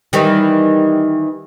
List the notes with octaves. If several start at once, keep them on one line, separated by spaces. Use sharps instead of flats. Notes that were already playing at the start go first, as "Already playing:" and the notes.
D#3 E3 G3